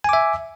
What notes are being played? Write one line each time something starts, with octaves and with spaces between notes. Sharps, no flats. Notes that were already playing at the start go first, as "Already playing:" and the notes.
E5 G#5 D6